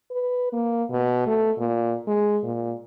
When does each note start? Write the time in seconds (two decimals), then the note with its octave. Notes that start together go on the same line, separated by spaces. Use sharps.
0.11 B4
0.53 A#3
0.91 B2
1.27 A3
1.58 A#2
2.07 G#3
2.43 A#2